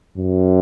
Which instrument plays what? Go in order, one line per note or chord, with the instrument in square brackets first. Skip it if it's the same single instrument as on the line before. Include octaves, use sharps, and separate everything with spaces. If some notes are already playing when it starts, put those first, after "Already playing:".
[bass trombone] F#2